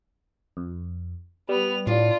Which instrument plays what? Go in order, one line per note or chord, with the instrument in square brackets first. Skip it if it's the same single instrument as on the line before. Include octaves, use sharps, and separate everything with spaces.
[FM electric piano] F2
[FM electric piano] G3 [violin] B3 F7
[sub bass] A2 [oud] D4 [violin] F4